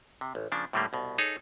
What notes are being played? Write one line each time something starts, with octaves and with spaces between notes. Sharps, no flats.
C3
A1
C#3 F3 A#3 D4
A2 D3 G3 A3 A#3
C2 B2
D#4 G#4 A4 C#5